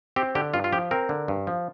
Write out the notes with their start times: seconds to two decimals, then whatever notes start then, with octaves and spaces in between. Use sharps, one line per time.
0.16 C4 G4
0.35 D3 G4
0.54 G2 F4
0.64 F4
0.72 F3 G4
0.91 C4 A#4
1.09 D3
1.28 G2
1.47 F3